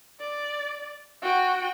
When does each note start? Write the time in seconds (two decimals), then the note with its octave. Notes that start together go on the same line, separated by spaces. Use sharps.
0.20 D5
1.22 F#4 G5